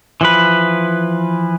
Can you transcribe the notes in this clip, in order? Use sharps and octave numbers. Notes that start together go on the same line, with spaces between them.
E3 F3 B4